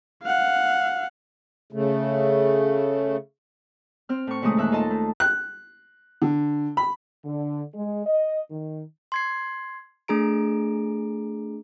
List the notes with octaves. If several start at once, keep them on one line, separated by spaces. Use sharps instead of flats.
F5 F#5
C#3 A3
C4 F6
A2 C#6
A#2 C#3 E3 G#3 A3 D#6
D#2 E5 F#6
D#4 F4 A4 D#5 A5
A3
F#6
D3
B5
D3
G#3
D#5
D#3
C6 G#6 C7
A3 D4 G#4 A#5 D7